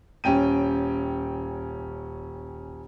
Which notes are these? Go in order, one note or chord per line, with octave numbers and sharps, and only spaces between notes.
D#1 C#4 G5 D#7